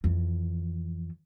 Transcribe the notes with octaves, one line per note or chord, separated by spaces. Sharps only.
F2 E3